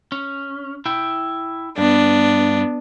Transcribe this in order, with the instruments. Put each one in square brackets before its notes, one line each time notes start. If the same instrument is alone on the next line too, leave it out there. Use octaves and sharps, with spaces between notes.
[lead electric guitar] C#4
E4 G5
[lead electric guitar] G2 [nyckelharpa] B3 D4